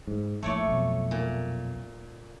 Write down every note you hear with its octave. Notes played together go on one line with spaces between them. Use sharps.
G#2
A#1 A2 A3 C#5 D5
B1 F2
A#2